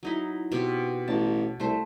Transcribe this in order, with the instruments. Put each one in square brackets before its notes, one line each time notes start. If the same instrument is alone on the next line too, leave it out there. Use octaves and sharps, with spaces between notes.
[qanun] F#3 D#4 E4
B2 C4 G4
[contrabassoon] A1 [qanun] A5
[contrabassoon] C2 [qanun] A3 C5